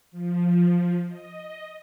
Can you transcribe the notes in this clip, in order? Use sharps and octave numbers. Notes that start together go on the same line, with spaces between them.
F3
D#5